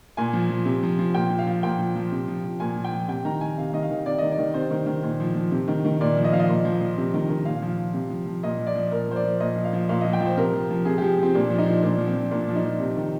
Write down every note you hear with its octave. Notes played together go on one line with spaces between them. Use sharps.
A#2 G#5
F3
F3
C3
F3
F3
A#2 G5
F3
F5
F3
A#2 G5
F3
F3
C3
F3
F3
A#2 G#5
F3
G5
F3
C3 G5
D#3 A#5
D#3 G#5
C3 F5
D#3 D#5
F5
D#3
C3 D5
D#3 D#5
D5
D#3
C3 C5
D#3
D#3
A#2
F3
F3
C3
D#3
D#3
A#2 D5
F3
D#5
F3 F5
D#5
A#2
F3
F3
C3
D#3
D#3
A#2 F5
F3
F3
C3
F3
F3
A#2 D#5
F3
D5
F3
A#2 A#4
F3 C5
D5
F3
A#2 D#5
F3
F5
F3
A#2 F5
F3 D#5
G5
F3 C5
C3 A#4
F3
F3
C3 G#4
F3 G4
F3 C4
A#2 D4
F3
D#4
F3
A#2 D4
F3
C4
F3
A#2 D4
F3
D#4
F3
C3
D#3